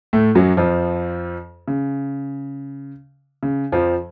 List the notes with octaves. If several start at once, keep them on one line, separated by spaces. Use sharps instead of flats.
A2 A3
F#2 F#3
F2 F3
C#3
C#3
F2 F3